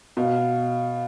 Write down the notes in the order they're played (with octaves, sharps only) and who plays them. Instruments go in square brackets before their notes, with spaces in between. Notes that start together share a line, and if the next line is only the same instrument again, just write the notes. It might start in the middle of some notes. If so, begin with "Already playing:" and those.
[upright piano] B2 [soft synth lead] F5